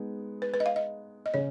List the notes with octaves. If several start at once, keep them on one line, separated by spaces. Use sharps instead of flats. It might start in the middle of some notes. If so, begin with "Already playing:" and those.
Already playing: G#3 B3 D#4
B4
B4
D#5
F5
D#5
D#5
C#3 C#5